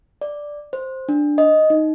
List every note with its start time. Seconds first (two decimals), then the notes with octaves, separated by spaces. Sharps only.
0.21 D5
0.73 C5
1.09 D4
1.38 D#5
1.70 D#4